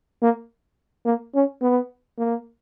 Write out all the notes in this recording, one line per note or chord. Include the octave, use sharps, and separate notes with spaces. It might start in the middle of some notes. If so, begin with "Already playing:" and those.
A#3
A#3
C#4
B3
A#3